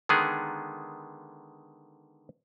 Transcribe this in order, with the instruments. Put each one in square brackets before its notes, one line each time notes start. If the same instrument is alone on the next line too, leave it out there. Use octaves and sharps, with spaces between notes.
[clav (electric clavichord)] D3 D#3 G#3 B3 G#4